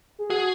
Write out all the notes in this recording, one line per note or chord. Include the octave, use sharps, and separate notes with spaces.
G#4
F#4 G#4